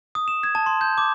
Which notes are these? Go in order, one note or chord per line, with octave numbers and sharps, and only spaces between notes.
D#6
E7
G#6
A5
C6
G6
D6